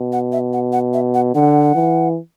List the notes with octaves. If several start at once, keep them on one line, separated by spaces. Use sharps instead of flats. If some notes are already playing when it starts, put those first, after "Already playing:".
Already playing: B2
F#5
E5
F#5
F#5
E5
F#5
D3 F#5
E3